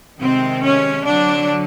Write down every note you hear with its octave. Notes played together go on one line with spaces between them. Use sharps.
C3 D#3 G#3 C4
C#4
D3 F#3 D4